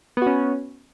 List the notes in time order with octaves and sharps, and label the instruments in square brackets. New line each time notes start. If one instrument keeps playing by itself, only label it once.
[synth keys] B3
F#4
C#4